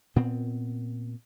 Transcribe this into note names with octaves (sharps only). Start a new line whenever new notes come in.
A#2 B3 C4